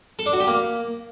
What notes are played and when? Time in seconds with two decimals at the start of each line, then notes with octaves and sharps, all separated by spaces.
0.19 A4
0.26 D4
0.33 F#4
0.40 G4
0.47 A#3